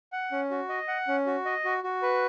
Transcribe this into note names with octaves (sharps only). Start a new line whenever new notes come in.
F#5
C#4
F#4
D#5
F#5
C#4
F#4
D#5
F#4
F#4
B4